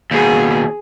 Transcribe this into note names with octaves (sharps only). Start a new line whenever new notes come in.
D#2 B2 G#4